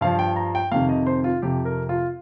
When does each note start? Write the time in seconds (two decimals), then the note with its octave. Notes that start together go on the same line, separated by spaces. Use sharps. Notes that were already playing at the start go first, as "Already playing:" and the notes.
0.01 G2 F3 F5
0.19 G5
0.36 A#5
0.55 G5
0.71 F2 C3 D#3 F5
0.89 D#5
1.06 C5
1.24 F4
1.42 F2 C3 F3 G4
1.65 A#4
1.89 F4